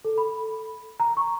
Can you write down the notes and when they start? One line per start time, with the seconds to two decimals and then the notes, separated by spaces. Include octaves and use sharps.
0.05 A4
0.18 B5
1.00 A#5
1.17 C#6